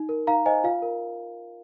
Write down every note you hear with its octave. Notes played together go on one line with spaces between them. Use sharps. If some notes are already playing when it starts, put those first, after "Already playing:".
Already playing: D#4
A#4
D#4 F5 A#5
C5 D#5 G#5
F4 F5
A#4